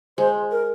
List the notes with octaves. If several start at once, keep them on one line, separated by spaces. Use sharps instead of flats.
G#3 C5
A#4